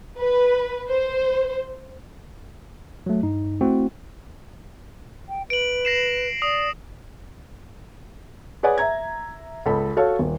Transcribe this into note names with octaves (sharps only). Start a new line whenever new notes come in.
B4
C5
F#3 A3
G2 D#4
A3 C4 E4 F#4
G5
B4 D7 F#7
A#6 C7 E7
D5 D#6
G#4 B4 C#5 D5 F#5 G#5
E5 A#5 G#6
C#2 A4 B5
F#4 A4 C#5 F5
D#1